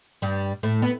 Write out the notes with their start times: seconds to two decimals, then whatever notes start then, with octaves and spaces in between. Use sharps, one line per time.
0.22 G2 G3
0.63 A2 A3
0.82 B3